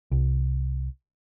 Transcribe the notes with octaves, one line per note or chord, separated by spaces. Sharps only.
C2